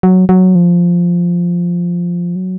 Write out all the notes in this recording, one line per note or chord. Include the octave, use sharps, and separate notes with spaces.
F#3
F#3
F3
F#3